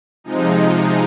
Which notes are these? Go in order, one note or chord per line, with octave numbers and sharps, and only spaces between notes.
C3 F3 G#3 D#4